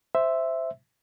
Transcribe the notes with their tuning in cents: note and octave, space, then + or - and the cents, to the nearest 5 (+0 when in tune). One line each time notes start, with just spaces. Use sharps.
C5 -5 E5 +0